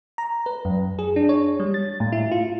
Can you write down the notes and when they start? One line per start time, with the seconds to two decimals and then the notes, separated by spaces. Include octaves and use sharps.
0.18 A#5
0.46 B4
0.65 F#2
0.99 G#4
1.16 D4
1.29 C#5
1.60 G3
1.74 A6
2.00 A2
2.12 E4
2.32 F4